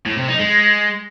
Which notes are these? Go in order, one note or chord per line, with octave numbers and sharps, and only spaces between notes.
A2
C3
D#4
G#3